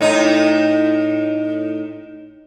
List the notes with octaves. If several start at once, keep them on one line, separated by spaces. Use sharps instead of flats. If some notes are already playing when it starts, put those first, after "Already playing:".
A2 D#4